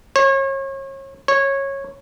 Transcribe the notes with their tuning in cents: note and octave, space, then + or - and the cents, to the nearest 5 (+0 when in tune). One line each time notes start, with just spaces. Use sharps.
C#5 -35
C#5 -15